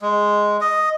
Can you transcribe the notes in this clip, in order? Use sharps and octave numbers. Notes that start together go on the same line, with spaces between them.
G#3
D#5